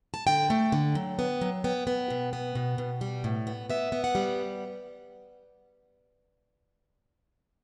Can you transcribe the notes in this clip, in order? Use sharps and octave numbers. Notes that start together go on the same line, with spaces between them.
A5
D3 G5
A3
D3
F#3
B3
F#3
B3 G5
B3
B2
B3
B2
B2
G3
A2
B3
B3 E5
B3
F#5
G3